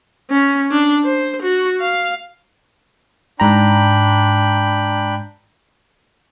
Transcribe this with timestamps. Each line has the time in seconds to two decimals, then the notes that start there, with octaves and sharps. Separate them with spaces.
0.30 C#4
0.71 D4
1.05 C5
1.42 F#4
1.80 F5
3.40 G#2 D4 G5 A#5 B5